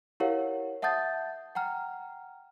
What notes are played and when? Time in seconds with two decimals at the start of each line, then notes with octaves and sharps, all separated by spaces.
0.20 E4 G4 A#4 C#5 F5 F#5
0.82 E5 F#5 A5 D#6 G6 A6
1.55 F#5 G5 A#5 F6